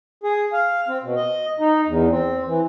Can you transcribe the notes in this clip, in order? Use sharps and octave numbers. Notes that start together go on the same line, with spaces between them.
G#4
F5
C4
B2
D#5
D#4
E2
C4
E3